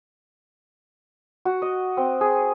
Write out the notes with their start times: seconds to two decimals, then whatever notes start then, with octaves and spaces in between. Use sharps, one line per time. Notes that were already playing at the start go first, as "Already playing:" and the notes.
1.45 F#4
1.62 D#5
1.97 C4
2.21 G#4